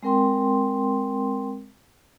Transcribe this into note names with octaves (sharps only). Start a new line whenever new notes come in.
G#3 C4 A#4 G5 C6